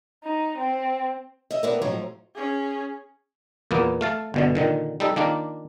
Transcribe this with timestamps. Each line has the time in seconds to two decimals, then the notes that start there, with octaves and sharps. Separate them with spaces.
0.24 D#4
0.58 C4
1.51 D#5 E5
1.63 B3 C4 D4 E4 A#4
1.82 A2 F3 F#3 C4 D#4 A#5
2.35 C#4 G#4
3.71 E2 A#2 A#3 B3
4.01 A3 F5 A5
4.34 G1 B2 D3
4.55 A#2 D3 D#3
5.00 G3 D#4 A4
5.16 D#3 A#3 D4 F4